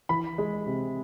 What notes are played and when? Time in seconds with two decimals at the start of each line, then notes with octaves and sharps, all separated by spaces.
0.09 E3 B5
0.38 G#3
0.66 C3